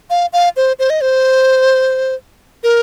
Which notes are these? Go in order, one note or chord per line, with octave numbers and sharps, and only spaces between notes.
F5
F5
C5
C5
D#5
C5
A#4